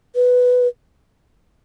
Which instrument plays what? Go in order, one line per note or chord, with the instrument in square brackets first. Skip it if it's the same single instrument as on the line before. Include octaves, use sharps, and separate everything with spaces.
[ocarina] B4